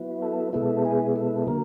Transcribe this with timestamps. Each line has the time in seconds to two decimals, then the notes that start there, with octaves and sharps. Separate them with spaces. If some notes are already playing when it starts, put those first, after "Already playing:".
Already playing: F#3 B3 E4
0.22 A4
0.53 B2 G#3 B3 E4 A4
0.85 G#4
1.16 A4
1.47 D3 F#3 A#3 A#4